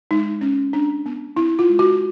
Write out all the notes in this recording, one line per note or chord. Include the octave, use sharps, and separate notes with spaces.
G#3 D#4
C#4
D4
B3
C4 E4
F4
G#3
F#4